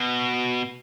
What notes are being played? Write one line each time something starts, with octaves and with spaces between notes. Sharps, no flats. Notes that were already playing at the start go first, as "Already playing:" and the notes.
Already playing: B2